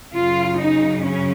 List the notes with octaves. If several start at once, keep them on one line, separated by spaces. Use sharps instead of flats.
F#2 C#3 F4
D#4
C#4